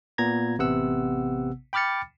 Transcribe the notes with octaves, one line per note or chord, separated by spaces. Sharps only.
A#2 B3 A#5 G#6 A#6
A1 C3 B3 F#5 E6
G5 B5 D6 F6 A6 C#7